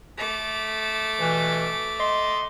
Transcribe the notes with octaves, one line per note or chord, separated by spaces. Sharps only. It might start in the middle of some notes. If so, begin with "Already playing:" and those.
A3 D6
G2 B2 E3
D#5 C6